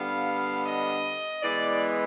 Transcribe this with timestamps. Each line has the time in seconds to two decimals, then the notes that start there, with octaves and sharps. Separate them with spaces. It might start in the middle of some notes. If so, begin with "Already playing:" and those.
Already playing: D3 G3 B3 F5
0.63 D#5
1.42 E3 G#3 B3 D5